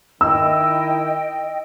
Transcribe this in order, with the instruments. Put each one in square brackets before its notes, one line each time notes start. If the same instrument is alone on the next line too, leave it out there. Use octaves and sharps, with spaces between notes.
[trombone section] D#3 E4 [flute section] D#5 G5 [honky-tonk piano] E6